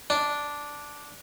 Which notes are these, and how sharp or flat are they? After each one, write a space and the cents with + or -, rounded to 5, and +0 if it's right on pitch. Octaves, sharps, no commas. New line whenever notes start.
D4 -5